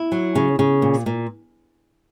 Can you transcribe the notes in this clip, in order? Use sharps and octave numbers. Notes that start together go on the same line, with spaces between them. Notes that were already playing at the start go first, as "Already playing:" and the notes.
Already playing: E4
F#3
C#3
C#3
A#2
A#2